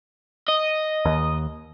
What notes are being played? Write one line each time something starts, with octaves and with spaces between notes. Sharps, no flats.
D#5
D#2